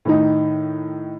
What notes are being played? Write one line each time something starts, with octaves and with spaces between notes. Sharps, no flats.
A2 D#3 D#4